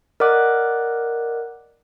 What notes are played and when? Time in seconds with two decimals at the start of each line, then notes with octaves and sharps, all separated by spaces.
0.20 A#4 D5 D#5 F#5 D6 F#6